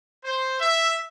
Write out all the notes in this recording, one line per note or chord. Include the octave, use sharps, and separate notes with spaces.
C5
E5